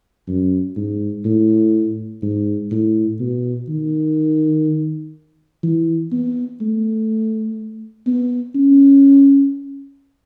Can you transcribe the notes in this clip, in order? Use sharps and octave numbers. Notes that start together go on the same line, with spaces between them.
F#2
G#2
A2
G#2
A2
B2
D#3
E3
B3
A3
B3
C#4